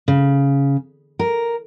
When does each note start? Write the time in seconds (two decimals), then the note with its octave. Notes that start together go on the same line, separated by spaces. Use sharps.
0.08 C#3
1.19 A#4